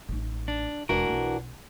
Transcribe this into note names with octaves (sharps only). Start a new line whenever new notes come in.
A1 D#4
D4
E1 E3 D4 F#4 A#4
B1